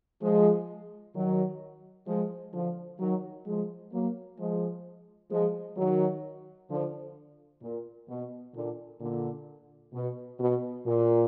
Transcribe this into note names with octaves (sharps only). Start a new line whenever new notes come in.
F3 G#3
D#3 F#3
F3 G#3
D3 F3
D#3 F#3
F3 G#3
F#3 A#3
F3 G#3
F3 G#3
D#3 F#3
D3 F3
A#2
B2
A#2 D3
A#2 D3
B2
B2
A#2